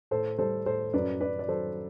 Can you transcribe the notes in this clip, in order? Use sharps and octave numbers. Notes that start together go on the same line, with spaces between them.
A2 A4 C5
G3 A4 C5
A2 A4 C5
F#2 B4 D5
F#2 B4 D5
D5
F#3 A4 C5